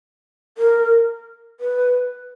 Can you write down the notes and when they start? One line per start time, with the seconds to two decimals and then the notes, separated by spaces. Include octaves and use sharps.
0.58 A#4
1.60 B4